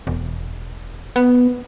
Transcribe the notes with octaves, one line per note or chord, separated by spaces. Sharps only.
E1
B3